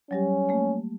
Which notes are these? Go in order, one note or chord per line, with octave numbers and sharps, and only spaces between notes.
F#3 G3 C#4 G4
A3 A#3